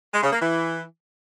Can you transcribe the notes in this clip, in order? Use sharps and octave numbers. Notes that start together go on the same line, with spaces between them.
G#3
C#3
A#3
E3